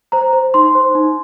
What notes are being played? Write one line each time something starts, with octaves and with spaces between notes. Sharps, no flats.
C5 A#5
C5
D#4 C6
C5
D#4